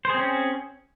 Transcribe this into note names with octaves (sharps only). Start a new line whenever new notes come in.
C4 C#4 G#4 C5